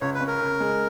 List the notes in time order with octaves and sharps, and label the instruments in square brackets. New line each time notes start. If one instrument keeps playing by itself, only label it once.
[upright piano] C#2 [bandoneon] C#5
[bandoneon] B4
[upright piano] C#4
[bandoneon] A#4
[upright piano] C#3
G#3